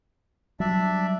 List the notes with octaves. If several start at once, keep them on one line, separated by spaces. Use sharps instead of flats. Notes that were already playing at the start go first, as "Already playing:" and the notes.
F#3 G3 D4 D5 E5